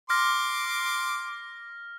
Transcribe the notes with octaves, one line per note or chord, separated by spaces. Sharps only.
C6 D6 F6 A#6